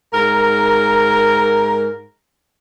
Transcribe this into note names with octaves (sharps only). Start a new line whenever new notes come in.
G#2 A#4